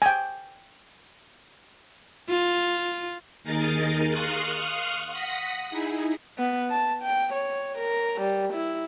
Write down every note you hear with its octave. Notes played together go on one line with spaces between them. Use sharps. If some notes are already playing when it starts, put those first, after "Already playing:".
G5 G#5
F4
D#2 D#4 G#4 A#4 D#5 A6
F5 C6 C#6 D#6 F6 F#6
F#5 D#6 A#6 B6
D#4 E4 G#4
B3
A5
G5
C#5
A#4
G3
E4